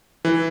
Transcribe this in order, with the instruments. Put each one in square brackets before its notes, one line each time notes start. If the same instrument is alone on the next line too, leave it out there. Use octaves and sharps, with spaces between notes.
[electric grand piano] E3